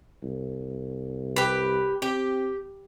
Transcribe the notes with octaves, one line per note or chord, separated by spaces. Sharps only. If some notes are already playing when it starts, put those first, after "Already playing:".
C2
G4 B4
C4 G4